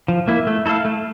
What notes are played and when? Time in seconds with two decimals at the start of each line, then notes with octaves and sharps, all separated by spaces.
0.08 F3
0.28 A#3 E4
0.47 A3
0.66 E4 A4 C#5 F5
0.85 A3